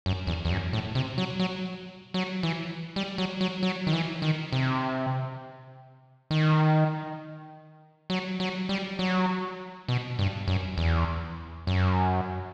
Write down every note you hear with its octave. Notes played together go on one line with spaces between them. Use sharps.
F#2
E2
E2
F#2
A2
C3
F#3
F#3
F#3
E3
G3
F#3
F#3
F#3
D#3
E3
D#3
C3
D#3
F#3
F#3
G3
F#3
B2
G2
F#2
E2
F#2